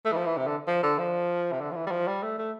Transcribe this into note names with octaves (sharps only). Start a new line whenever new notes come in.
A3
E3
F3
E3
C3
D3
F3
D3
F3
C3
D3
F3
E3
G3
F3
G3
A3
A3